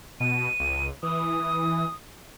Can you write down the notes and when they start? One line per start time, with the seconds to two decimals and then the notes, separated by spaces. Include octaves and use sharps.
0.20 B2 D#7
0.60 C#2
1.03 E3 D#6